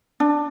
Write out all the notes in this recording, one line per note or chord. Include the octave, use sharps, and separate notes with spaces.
D4